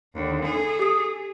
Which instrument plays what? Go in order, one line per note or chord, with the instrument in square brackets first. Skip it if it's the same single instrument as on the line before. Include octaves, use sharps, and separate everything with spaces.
[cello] D#2 D3
G#4 A4
[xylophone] G4 D#6